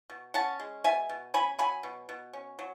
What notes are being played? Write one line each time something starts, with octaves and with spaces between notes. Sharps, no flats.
B2
C#4 F#5 A5
G#3
B2 E5 G#5
B2
C#4 G#5 B5
F#3 G#5 B5
B2
B2
C#4
F#3